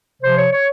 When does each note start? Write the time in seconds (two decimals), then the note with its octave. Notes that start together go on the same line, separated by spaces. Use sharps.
0.22 C3 F3 C5
0.37 C#5
0.51 C#5